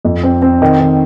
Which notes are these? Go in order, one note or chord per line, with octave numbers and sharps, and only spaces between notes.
F2
C4
C4
D#3
D#3